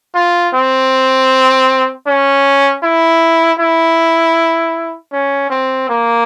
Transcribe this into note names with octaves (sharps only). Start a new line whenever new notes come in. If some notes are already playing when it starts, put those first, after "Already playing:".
F4
C4
C#4
E4
E4
C#4
C4
A#3